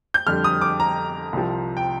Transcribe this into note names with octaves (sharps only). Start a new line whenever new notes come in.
G6
F2 D3 G3 F6
D#6
D6
A#5
C2 C3 F3
G5